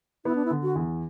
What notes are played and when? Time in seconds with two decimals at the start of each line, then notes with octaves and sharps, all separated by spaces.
0.25 B3 E4
0.35 D4
0.45 E4
0.50 D3
0.63 F#4
0.75 E2